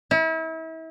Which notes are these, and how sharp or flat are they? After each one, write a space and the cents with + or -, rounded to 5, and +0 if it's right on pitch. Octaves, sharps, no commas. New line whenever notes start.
E4 -35